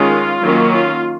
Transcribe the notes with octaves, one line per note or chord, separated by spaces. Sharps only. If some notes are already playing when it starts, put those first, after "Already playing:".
Already playing: D#3 G#3 C#4 F4
D#3 F#3 A#3 C#4
F4